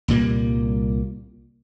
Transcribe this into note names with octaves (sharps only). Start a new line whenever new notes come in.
C2 A#2 G3 A#3